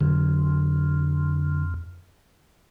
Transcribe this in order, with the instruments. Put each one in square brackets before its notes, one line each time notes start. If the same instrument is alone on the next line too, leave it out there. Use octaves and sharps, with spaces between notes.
[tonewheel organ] F2 [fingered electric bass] D3 F#3